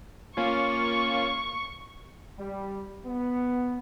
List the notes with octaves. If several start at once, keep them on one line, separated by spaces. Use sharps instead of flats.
A#3 C#4 F4 C#6
G3
B3